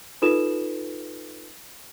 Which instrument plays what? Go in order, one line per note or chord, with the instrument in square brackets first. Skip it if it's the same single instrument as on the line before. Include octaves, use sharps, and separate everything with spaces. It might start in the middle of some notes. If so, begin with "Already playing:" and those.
[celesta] D#4 F4 A4 B4 E7